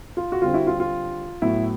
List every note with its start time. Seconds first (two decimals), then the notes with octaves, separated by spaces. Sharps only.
0.17 F4
0.32 F#4
0.41 D3 G3 C4 F4
0.54 E4 F#4
0.67 F4
0.80 F4
1.42 A2 F#3 B3 E4